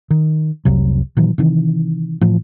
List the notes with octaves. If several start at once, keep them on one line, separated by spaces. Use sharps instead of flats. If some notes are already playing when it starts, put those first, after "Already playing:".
D#3
F1 C2 C3 F#3
A#2 D#3 E3 F#3
C3 D#3 E3
A2 E3 F3